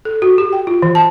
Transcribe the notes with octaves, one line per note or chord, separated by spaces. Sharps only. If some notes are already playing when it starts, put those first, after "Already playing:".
A4
F#4
G4
G5
F4
E3
A5